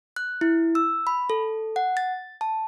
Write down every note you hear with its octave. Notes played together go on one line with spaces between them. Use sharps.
F#6
E4
E6
B5
A4
F#5
A6
A5